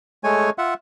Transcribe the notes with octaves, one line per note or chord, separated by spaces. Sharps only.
G#3 A3 C#5 G#5
F4 E5 F#5